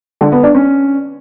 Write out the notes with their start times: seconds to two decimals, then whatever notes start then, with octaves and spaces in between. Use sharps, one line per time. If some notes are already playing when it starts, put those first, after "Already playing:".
0.21 D3
0.32 B3
0.43 D4
0.55 C#4